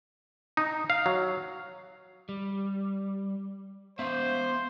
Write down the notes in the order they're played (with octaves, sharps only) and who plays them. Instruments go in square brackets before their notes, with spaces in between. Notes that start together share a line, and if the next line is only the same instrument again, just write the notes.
[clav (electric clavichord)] D#4
F5
F#3
[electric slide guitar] G3
[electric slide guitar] B3 E5 F5 [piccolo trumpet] C5